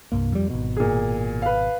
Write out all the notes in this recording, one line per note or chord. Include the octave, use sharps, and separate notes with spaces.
C2 G2 A#3
F2 G3
G#1 B2
A#2 G#4
B4 F5